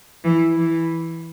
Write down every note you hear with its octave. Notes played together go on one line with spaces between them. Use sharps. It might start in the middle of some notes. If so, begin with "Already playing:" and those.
E3
E3